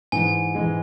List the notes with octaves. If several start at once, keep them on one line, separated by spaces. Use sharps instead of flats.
G#2 E3 G#3 G#5
G#2 E3 G#3